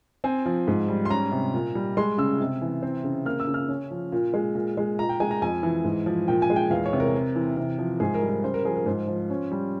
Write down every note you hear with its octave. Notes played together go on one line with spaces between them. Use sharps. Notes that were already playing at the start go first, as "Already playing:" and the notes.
C4 G#5
F3
G#2
G3
C6
C#4 A#5
C3
A#2
G3
G#3 C6
C#3 E6
C3
E3
C4
C#3
A#3 F6
E6
C#3
F6
C#4
F3
A#2
G#3
A#2
G#3
A#2 A#5
G5
G#3 G#5
A#5
F2 G#5
E3
G#2
F3
A#2 G5
G#5
G#3
G5
E2 F5
C#5
C3
A#4
C4
E3
C3
F3
G#2 G#4
A#4
G3
A#4
C#3 C5
A#4
F3 G#4
A#4
G#2 C5
F3
C#4
G3